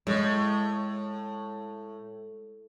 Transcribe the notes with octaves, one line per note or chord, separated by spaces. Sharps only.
A2 G#3